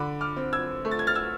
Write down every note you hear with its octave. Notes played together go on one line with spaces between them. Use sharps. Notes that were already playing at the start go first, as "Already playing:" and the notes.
Already playing: D3 B5 D6
D6 F6
C4
E6 G#6
A3
A6
G#6
F6 A6
E6 G#6